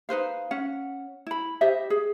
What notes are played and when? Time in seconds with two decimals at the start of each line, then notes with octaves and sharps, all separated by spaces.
0.09 D#4 B4 C5 F5
0.51 C#4 F#5
1.27 E4 B5
1.61 G4 C5 D#5 E5
1.90 G#4